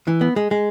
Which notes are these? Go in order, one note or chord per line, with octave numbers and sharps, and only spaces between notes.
E3
B3
G#3
G#3